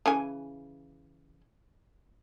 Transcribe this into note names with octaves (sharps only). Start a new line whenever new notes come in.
C#3 E3 G#5